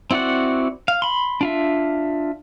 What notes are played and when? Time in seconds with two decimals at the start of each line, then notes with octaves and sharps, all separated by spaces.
0.11 C4 E4 F#4 D5 F#5
0.88 F5
1.02 B5 C6
1.41 D4 F4 E5